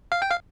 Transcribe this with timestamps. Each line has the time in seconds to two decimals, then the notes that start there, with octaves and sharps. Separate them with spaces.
0.12 F5
0.22 G5
0.31 F5